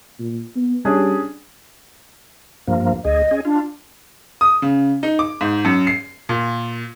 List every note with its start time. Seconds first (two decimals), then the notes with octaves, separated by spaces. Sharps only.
0.19 A#2
0.56 B3
0.85 G3 C#4 D4 G#4
2.67 G2 F3 A#3
3.05 D2 G#4 D#5
3.31 C#4 G#4
3.45 D4 F4
4.41 D#6
4.62 C#3
5.03 D#4
5.19 D6
5.41 G#2
5.65 F#2
5.87 C7
6.29 A#2